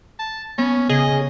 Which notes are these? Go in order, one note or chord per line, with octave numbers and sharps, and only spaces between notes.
A5
B3 C#4
C#3 G#4 D#5